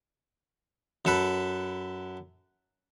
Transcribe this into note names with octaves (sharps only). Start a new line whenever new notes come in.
F#2 A4 B4